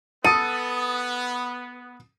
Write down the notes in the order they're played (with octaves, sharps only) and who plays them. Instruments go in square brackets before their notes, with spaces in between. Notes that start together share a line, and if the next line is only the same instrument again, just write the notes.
[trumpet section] B3 [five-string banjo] A4 [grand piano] D#6 A6 D#7